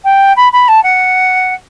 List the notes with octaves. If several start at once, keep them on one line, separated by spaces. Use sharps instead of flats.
G5
B5
B5
A5
F#5